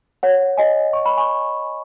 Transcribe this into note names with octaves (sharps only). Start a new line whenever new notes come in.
C#5 F#5
D#5 G#5
C#6
B5
G#5 C#6